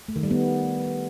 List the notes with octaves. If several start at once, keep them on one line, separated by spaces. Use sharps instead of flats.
A3
D#3
G3
B3